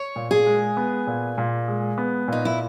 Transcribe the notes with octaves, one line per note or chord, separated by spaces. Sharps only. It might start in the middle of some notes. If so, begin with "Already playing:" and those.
Already playing: C#5
A#2
G#4
G#3
B3
A#2
A#2
G#3
B3
A#2 D#4
E4